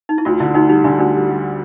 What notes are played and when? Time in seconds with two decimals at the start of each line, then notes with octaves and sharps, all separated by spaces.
0.09 D#4
0.18 E4
0.25 D2 F4
0.40 D3 E4
0.55 D2 D#4
0.69 G3 D#4
0.84 D3 D4
0.99 D2 D4
1.14 G3
1.29 G3